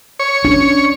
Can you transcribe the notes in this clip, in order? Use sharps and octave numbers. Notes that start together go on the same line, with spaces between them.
C#5
C#4 D4